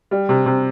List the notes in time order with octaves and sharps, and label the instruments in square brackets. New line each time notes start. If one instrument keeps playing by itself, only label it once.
[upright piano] G3
C3
C3